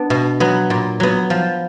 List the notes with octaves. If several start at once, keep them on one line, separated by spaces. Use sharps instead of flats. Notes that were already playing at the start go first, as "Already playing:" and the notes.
Already playing: B3 D4
B2
F#3 B3
A#2
F#3 B3
F3